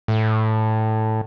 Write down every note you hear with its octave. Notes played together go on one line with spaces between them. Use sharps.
A2